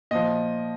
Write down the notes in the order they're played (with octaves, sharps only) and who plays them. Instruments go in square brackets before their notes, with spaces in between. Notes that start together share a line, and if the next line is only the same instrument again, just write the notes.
[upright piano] A#2 F3 D#5